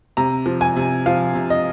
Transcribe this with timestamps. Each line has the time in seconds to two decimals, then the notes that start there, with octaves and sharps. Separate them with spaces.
0.17 C3 A#5
0.46 F3
0.61 G#5
0.76 C3
1.06 F3 F5
1.35 C3
1.50 D#5